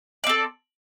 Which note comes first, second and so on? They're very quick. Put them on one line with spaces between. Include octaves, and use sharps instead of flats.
D5 C4 A4